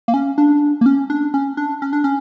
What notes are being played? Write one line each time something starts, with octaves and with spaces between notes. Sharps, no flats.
A#3
C#4
D4
A#3
C#4
D4
C#4
D4
C#4
D4
C#4